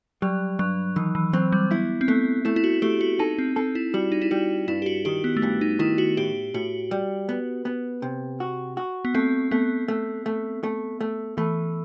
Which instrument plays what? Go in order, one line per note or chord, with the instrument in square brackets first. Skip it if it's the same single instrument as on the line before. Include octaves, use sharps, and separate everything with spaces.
[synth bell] F#3 [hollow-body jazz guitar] G3
[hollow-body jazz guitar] G2 [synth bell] F#3
[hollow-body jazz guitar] D#3 [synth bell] E3
[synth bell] E3
[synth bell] F#3 [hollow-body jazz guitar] C4
[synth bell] G3
[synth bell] B3 [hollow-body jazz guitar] E4
[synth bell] C4
[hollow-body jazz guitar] A3 [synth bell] B3
[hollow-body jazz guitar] A3 [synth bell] E4
[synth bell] E4
F#4
[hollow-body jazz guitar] A3 [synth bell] G4
[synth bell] F#4
[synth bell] D#4 [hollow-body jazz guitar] A4
[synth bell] C4
[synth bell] C4 [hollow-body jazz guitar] A4
[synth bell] E4
[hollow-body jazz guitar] G3 [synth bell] F#4
[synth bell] D#4
E4
[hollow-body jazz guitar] G3 [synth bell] F#4
[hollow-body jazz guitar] G2 [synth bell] E4
[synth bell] G4
F#4
[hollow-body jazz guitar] D#3 [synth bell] G4
[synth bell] B3
A3
[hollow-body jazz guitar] G2 [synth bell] B3
[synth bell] D#4
[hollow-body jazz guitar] D#3 [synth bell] E4
[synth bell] F#4
[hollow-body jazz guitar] A2 [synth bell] G4
[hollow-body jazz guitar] A2 [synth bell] F#4
[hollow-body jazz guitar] G3
B3
B3
C3
F#4
F#4
[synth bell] B3
[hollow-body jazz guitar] A3 [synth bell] C4
[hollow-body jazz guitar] A3 [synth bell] B3
[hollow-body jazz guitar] A3
A3
A3
A3
[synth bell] E3 [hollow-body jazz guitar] A3